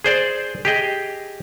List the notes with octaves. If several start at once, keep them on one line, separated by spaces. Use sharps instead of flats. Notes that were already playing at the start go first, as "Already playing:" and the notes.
G#4 C5 D5
G4 G#4 D#5